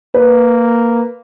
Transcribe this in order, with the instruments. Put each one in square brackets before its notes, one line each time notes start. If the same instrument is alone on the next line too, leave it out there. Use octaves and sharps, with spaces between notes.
[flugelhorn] A#3 [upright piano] B4